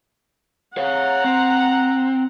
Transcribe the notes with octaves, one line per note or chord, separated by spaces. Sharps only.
C#5 F5 F#5 A#5
C4